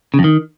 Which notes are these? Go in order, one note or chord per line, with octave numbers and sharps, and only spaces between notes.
C#3
F2
D#3